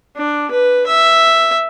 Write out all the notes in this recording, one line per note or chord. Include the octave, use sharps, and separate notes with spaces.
D4
B4
E5